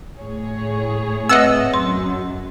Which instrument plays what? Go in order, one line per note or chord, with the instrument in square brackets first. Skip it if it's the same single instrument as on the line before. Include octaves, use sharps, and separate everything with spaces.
[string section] A2 G#4 C#5
[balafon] C4 B4 E5 [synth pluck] D#5 F#5 E6
[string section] F#2 [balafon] C6